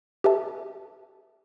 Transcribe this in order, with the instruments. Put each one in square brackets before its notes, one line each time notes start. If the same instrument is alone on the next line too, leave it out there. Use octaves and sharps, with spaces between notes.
[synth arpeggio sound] G4 A4 B4 E5 A5